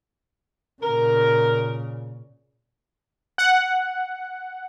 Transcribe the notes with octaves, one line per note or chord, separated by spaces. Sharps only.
A#2 C#3 A#4
F#5